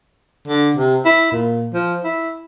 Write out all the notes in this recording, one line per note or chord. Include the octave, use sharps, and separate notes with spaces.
D3
C3
E4
A#2
F3
E4